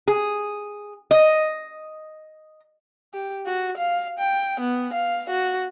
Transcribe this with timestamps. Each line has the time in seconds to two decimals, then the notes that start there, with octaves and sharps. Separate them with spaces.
0.08 G#4
1.11 D#5
3.14 G4
3.46 F#4
3.77 F5
4.19 G5
4.60 B3
4.94 F5
5.30 F#4